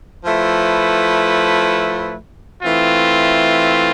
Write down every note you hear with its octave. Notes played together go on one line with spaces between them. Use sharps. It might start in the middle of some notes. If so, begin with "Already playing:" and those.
F3 A3 E4 B4
E3 A3 C4 F4